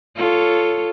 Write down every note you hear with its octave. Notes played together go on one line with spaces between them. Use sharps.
F4 A4 C#5